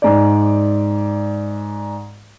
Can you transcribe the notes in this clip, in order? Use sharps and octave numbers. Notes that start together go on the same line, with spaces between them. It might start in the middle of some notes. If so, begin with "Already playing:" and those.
G#2 D5